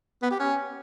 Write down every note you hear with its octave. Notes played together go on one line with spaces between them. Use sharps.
B3
G4
C#4